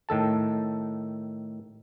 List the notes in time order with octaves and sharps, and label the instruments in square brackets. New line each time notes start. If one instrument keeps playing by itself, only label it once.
[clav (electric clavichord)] A2 D#3 A4 A5